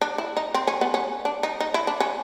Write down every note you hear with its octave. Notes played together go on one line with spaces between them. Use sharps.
D4
E4
D#4
C4
C#4
B3
C#4
D4
D#4
D#4
E4
D4
C#4